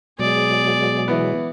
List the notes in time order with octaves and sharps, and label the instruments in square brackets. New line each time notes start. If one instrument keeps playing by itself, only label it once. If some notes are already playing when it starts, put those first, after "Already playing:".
[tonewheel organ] B2 F#3 G#3 [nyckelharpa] G#4 D5
[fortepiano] E3 B3